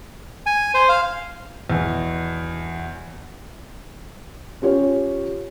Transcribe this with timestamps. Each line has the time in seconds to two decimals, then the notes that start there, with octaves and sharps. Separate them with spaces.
0.46 G#5
0.74 C5
0.89 F5
1.70 E2 B2
4.62 C#4 F4 G4 C#5